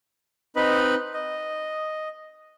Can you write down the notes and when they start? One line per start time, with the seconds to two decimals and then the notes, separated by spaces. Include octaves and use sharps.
0.56 C4 D#4 B4 D#5 B5
1.14 D#5